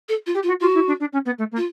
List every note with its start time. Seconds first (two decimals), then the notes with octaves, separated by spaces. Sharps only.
0.09 A4
0.26 F4
0.34 G4
0.43 F4
0.47 F#4
0.61 F4 F#4
0.74 E4
0.87 D4
1.00 D4
1.12 C#4
1.25 B3
1.38 A3
1.51 A#3
1.57 F4